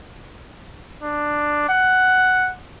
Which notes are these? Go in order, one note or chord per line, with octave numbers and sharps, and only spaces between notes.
D4
F#5